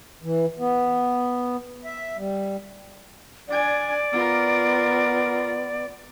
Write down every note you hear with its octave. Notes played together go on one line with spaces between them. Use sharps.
E3
B3
E5
G3
D4 D5 G#5
B3 F4 A#4